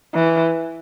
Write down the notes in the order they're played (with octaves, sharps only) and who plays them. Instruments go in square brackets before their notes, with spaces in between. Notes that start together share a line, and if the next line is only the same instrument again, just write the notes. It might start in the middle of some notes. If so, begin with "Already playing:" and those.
[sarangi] E3